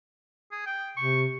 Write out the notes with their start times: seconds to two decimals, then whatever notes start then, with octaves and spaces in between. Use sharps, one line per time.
0.52 G#4
0.66 G5
0.97 C3 C#6